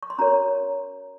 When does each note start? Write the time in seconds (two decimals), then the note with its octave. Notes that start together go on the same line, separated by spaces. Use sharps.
0.03 C#6
0.10 C6
0.18 C#4 F#4 A#4 C#5 A#5